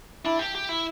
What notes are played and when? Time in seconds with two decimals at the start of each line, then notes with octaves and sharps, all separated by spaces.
0.25 D4 E4
0.39 G4
0.55 G4
0.69 E4